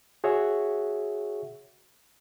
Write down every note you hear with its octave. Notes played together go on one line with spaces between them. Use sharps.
F#4 G#4 C#5 E5 F#5